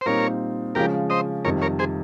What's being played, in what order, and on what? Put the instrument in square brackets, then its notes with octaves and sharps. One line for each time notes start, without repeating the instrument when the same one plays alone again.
[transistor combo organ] C5
[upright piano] A#2 G3 C4 D#4 [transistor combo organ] A#4 C#5
[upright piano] C#3 F3 G#3 C#4 F4 [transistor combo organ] G4 A#4
[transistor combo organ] C5 D#5
[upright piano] F2 C3 D#3 G3 [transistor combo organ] A#4 C#5
[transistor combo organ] A#4 C#5
G#4 C5